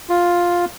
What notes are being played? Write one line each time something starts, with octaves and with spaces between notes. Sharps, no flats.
F4